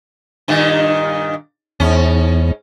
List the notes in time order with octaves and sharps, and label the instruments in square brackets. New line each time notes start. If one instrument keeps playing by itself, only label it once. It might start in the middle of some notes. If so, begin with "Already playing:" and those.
[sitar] G2 A#2 D#3
[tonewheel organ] E2 [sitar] G#2 C#4